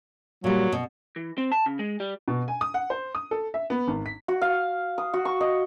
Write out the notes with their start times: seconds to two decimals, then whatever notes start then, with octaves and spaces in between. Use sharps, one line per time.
0.44 A#2 F#3 G3
0.72 B2
1.16 E3
1.38 C4
1.52 A5
1.66 C#3
1.79 G#3
2.00 G3
2.28 B2
2.48 G#5
2.61 D#6
2.74 F#5
2.90 C5
3.15 D#6
3.31 A4
3.54 E5
3.70 B3
3.88 G#1
4.06 B6
4.28 F#4
4.41 F5
4.98 D#6
5.13 F#4
5.25 C#6
5.41 D#5